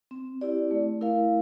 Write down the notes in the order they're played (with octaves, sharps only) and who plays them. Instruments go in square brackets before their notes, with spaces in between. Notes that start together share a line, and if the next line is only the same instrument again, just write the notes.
[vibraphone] C4
E4 G4 D5
A3
E4 A#4 F5